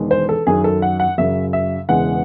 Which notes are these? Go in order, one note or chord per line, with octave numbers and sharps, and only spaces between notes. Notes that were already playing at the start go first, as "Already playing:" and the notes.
Already playing: E1 E2 D#3 G#3
C5
A4
F#2 D#3 F#3 G#4
A4
F#5
F#5
F#2 C#3 F#3 E5
E5
E1 E2 C#3 E3 G#3 F#5